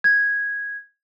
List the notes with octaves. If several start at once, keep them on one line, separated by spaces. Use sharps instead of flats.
G#6